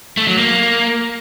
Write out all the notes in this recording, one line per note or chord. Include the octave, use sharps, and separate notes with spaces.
A3
F#3
A#3